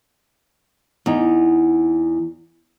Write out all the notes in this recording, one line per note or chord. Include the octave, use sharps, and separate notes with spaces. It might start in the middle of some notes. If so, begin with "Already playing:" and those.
E2 D#4